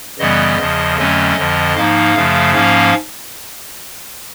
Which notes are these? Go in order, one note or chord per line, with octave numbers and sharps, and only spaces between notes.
F#2 C#3 E3 G3 B3 D#5
E2 C#3 F3
F2 D3 F#3 A3 C#4 D#5
F2 D3 F3
G#2 F3 A#3 D#4 F5
F#2 C#3 F3 A3
G#2 F3 A#3 C#4 F5